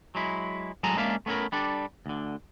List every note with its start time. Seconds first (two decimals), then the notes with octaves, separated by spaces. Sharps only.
0.15 F#3 G#3 E4
0.83 A2 F#3 G#3 A4 G#5 A#5
0.97 G#3 A#3 C#4 D4 E5 F5
1.26 A3 B3 C#4 E4 A#4
1.52 G3 D4 A4
2.06 D2 D3